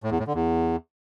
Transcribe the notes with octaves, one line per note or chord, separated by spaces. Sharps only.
A2
E2
A2
D3
E2